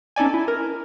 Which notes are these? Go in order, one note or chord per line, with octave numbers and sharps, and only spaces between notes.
C#4 D#4 A4 D5 G#5
E4
A#4